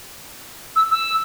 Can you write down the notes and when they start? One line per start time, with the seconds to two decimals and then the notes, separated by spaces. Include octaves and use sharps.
0.76 E6
0.91 E6